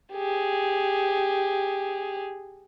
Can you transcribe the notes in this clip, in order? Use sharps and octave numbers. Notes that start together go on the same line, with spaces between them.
G4 G#4